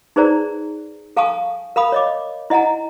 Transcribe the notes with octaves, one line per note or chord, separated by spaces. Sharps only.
D#4 G#4 B4 C5 D5 A#5
A4 F5 G#5 A5 C#6 D#6
A#4 F5 B5 D#6
C#5 D#5 D6
E4 D#5 F#5 G#5 A#5